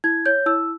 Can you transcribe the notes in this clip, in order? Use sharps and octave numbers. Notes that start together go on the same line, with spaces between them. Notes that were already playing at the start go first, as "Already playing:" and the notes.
E4 G#6
C#5 G6
E4 E6